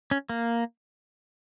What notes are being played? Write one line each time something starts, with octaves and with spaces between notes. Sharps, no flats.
C#4
A#3